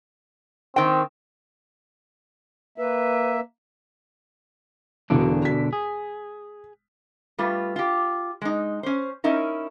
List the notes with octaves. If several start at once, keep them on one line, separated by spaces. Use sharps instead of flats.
D#3 C4 G5
A#3 B4 E5
E1 B2 D3 E3 D4
B6
G#4
G3 A3 F4 B4
F4 G4
G#3 D#4
C#4 C5
C#4 D#4 E4 A#4